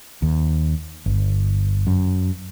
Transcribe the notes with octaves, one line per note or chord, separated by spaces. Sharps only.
D#2
G1
F#2